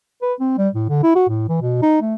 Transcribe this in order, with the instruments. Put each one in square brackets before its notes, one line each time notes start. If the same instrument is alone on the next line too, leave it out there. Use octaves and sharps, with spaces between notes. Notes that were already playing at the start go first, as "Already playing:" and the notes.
[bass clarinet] B4
C4
G3
A2
D3
E4
F#4
A2
E3
B2
D#4
A3